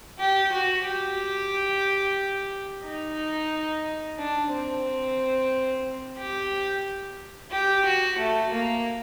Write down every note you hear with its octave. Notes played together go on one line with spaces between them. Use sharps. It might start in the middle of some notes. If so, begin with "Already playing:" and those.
G4
F#4
G4
D#4
D4
C4
G4
G4
F#4
A3
A#3